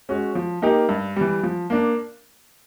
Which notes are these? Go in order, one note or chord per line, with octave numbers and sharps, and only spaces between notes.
G#3 C#4 F#4
F3
A#3 D#4 G4 A#4
G2
E3 G3
F3
A#3 D4